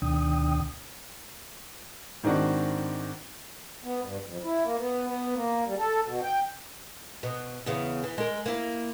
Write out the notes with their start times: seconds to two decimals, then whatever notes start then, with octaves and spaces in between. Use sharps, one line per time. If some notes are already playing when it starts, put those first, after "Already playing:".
0.02 D2 B2 D#3 D4 G5 D#6
2.23 G#2 D#3 C4 D4 F#4
3.84 B3
4.02 G2
4.26 F2
4.43 E4
4.64 A#3
4.79 B3
5.07 B3
5.35 A#3
5.66 G3
5.79 A4
6.07 B2
6.22 G5
7.23 B2
7.66 E2 C#3 B3
8.04 E3
8.18 G#3 A#4
8.46 A#3 E4